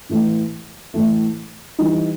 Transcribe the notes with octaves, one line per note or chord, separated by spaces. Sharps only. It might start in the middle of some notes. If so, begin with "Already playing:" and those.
A2 E3 A3
A2 E3 A3
E3 G3 D#4